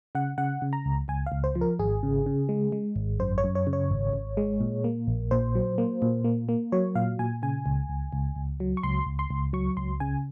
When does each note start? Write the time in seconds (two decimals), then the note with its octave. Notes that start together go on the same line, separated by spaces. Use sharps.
0.15 C#3 F#5
0.38 C#3 F#5
0.62 C#3
0.73 A#5
0.86 C#2
1.08 C#2 G#5
1.26 F5
1.32 C#2
1.44 C5
1.55 F3
1.61 A#4
1.79 G#1 G#4
2.03 C#3
2.26 C#3
2.49 G#3
2.72 G#3
2.96 G#1
3.20 F#2 C5
3.38 C#5
3.44 F#2
3.55 C#5
3.67 C#3
3.73 C#5
3.91 G#1
4.13 G#1
4.37 G#3
4.61 A#2
4.84 A#3
5.07 A#1
5.31 A#2 C5
5.55 F#3
5.78 A#3
6.02 A#2
6.24 A#3
6.49 A#3
6.72 F#3 C#5
6.95 A#2 F5
7.19 A#2 G#5
7.43 C#3 G#5
7.66 C#2
7.89 C#2
8.13 C#2
8.36 C#2
8.60 F#3
8.77 C#6
8.83 C#2 C6
9.06 C#2
9.19 C6
9.30 C#2
9.53 F#3 C#6
9.77 C#2 C6
10.00 C#3 G#5